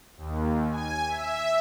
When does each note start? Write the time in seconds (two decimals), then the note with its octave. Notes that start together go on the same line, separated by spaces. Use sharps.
0.18 D#2
0.70 G#5
1.07 E5